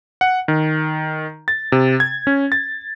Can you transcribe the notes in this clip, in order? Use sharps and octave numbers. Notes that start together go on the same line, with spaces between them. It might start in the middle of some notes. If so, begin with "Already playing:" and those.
F#5
D#3
A6
C3
G#6
C#4
A6